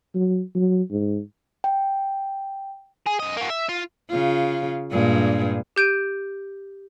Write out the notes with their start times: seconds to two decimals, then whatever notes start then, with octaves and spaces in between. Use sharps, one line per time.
0.15 F#3
0.55 F#3
0.91 G#2
1.64 G5
3.07 G#4
3.20 F#2 D#5
3.37 A#3 F#4
3.50 E5
3.69 F4
4.10 C#3 F4
4.92 G2 A#2 G#3
5.76 G4 G6 D7 D#7